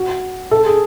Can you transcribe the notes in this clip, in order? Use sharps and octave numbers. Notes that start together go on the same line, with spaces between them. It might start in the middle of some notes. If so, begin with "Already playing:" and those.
Already playing: F#4
A4
G#4